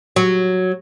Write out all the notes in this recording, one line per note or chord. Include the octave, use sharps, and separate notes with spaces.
F#3